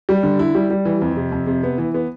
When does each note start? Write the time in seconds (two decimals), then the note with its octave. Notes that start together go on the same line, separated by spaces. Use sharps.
0.09 G3
0.23 D3
0.39 E4
0.55 G3
0.71 G3
0.85 E3
1.02 F2
1.17 C3
1.32 F2
1.47 C3
1.63 B3
1.78 E3
1.94 B3